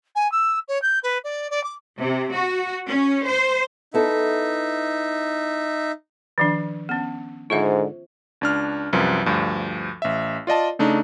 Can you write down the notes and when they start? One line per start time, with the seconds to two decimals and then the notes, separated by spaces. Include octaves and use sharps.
0.15 G#5
0.32 E6
0.68 C#5
0.82 G6
1.03 B4
1.24 D5
1.50 D5
1.64 D6
1.98 C3
2.34 F#4
2.88 C#4
3.26 C5
3.94 B3 D#4 E4 A4 E5
6.38 D#3 F3 D4
6.89 B3 C#4
7.50 G#2 D3 F4 C5 E5
8.41 C#2 D4 F6
8.93 C2 F#2 F3 B4
9.26 D2 G2 F3
10.02 A1 E5
10.47 F4 D5 D#5 A5
10.79 C#3 A3 D4 D#4